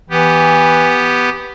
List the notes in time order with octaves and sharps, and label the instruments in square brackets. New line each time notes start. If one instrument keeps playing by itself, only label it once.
[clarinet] E3 [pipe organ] B3 G4